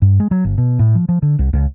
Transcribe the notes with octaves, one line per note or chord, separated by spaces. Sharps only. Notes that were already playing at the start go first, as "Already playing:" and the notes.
G2
G#3
F#3
G1
B2
A2
F3
F3
D3
C2
C#2